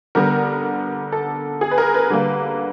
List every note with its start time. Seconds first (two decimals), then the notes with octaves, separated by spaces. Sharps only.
0.15 D3 G3 B3 A#4
1.12 A4
1.61 G#4
1.71 B4
1.78 A#4
1.94 B4
2.10 D3 G3 A#3